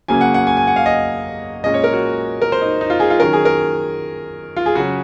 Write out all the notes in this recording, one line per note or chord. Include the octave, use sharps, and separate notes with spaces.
C#3 F#3 A#3 C#4 G#5
F#5
F#5
G#5
G#5
F#5
F5
D#5
A#2 G#3 C#4 D#5
C#5
A#4
F#4
A#4
C5
D#4
D#4
F4
G#4
F4
D#3 F#3 C#4 A#4
G#4
A#4
F4
G#4
C#3 F#3 C#4 F#4